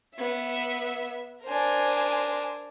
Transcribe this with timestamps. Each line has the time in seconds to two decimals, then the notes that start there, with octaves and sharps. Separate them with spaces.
0.16 B3 E5
1.45 D4 A#4 C5 G#5